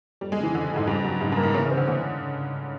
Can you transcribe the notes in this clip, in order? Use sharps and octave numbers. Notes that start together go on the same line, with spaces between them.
F2 G3
G#3
C#3
E3
F2 D3
F2
G#2
G2 C#3
F#3
G#2 C#3
G2
A#3
G#2
C#3 E3
C#3
C4
D3
D3 E3